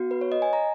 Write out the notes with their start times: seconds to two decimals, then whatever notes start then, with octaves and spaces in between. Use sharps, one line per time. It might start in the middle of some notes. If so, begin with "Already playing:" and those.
Already playing: B3 F#4
0.11 B4
0.21 C#5
0.32 D#5
0.42 G#5
0.53 A#5